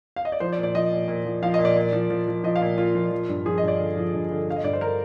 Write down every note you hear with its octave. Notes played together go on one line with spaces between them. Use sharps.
F5
D#5
D5
F3 C5
D5
A#2
D5
F3 D#5
A#2
A#2
F3
F3 F5
D#5
A#2
D5
A#2
F3
F3
F3
F3 D#5
F5
A#2
A#2 F4
F3
F3
G2
F3 G#4
D#5
G2 D5
D3
F3
G2
D3
D3 F5
D#5
G2 D5
C5
D3 A#4